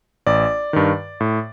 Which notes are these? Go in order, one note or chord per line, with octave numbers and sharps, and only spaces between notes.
A1 D5
G2 D#3
A2